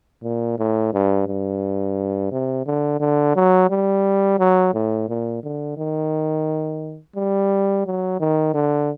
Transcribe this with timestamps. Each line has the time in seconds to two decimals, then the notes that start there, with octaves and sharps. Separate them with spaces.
0.23 A#2
0.58 A2
0.93 G2
1.27 G2
2.31 C3
2.66 D3
3.00 D3
3.36 F#3
3.70 G3
4.39 F#3
4.73 A2
5.08 A#2
5.43 D3
5.77 D#3
7.16 G3
7.86 F#3
8.20 D#3
8.54 D3